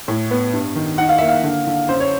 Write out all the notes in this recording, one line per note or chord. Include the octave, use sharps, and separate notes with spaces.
A2
B3
G2
D#3
D#4 F#5
F5
A#3 E5
F5
D3
D3
F#2 C5
C#5